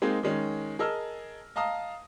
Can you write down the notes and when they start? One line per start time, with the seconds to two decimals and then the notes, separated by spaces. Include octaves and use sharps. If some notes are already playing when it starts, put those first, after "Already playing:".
0.02 G#3 A#3 C4 D#4 G#4
0.23 D#3 G#3 C#4
0.79 G#4 A#4 D#5 A5 E6 F6
1.56 D#5 F5 A5 A#5 D#6